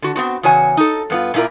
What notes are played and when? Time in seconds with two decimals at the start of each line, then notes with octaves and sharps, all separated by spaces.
0.02 D3 F#4
0.16 B3 C4 F#4
0.43 E2 C#3 F#4 C#5 G#5
0.77 D#4 A4
1.10 G2 B3 F4
1.34 A#2 A#3 E4 F4 A#4